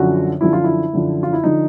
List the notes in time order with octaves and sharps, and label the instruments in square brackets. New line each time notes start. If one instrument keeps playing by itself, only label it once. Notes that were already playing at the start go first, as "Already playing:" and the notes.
Already playing: [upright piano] F#2 D3 F3 F#4
F#2 D3 F3 E4
F4
E4
F#2 D3 F3
F4
E4
D3 F3 D#4